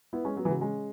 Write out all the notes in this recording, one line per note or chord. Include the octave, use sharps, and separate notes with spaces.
B3 E4
G#3 C#4
F#3 B3
E3
C#3 F#3
G#3 C#4